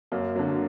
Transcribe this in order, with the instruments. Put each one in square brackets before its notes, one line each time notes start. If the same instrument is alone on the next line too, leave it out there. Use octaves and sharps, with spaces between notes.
[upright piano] F#2 A#3
D3 F#3